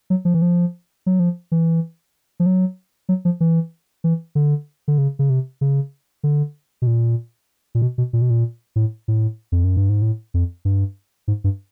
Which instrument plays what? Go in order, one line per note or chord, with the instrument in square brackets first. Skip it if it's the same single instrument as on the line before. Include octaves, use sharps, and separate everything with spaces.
[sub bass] F#3
F3
E3
F3
F#3
F3
E3
F3
F#3
F#3
F3
E3
E3
D3
D3
C#3
C#3
C3
C#3
D3
B2
A#2
A#2
B2
B2
A#2
B2
A#2
A2
A2
F2
F#2
G2
G#2
A2
F2
G2
G#2
G2